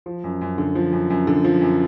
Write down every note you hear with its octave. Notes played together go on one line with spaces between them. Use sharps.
F3
F#2
F#2
D3
F3
F#2
F#2
D3
F3
F#2